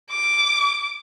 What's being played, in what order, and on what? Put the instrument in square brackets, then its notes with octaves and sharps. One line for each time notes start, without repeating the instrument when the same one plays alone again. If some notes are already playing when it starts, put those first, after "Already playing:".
[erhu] D6